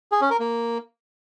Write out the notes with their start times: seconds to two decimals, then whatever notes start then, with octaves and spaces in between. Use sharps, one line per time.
0.12 G#4
0.21 C#4
0.30 A#4
0.40 A#3